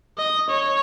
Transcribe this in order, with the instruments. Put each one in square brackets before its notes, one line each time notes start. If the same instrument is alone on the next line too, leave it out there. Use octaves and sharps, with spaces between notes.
[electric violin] D#5
C#5